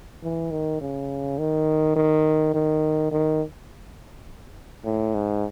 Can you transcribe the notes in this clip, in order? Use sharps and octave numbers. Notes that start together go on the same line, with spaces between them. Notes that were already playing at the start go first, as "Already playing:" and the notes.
E3
D#3
C#3
D#3
D#3
D#3
D#3
A2
G#2